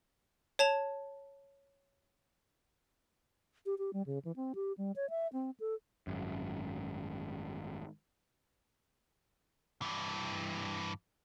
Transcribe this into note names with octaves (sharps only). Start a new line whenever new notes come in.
C#5 A5 F7
G4
G4
G3
C#3
E3
C4
G4
G3
C#5
E5
C4
A4
G#1 F#2
G2 E3